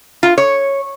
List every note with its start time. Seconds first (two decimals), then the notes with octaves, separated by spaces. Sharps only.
0.23 F4
0.38 C#5